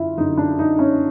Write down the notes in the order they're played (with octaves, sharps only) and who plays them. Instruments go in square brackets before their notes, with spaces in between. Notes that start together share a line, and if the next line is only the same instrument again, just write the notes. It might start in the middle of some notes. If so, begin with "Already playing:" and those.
Already playing: [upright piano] F#2 D3 E4 F4
F#2 D3 D#4
D4
D#4
C#4